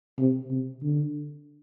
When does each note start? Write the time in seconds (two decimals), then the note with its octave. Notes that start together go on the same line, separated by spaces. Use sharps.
0.19 C3
0.51 C3
0.83 D3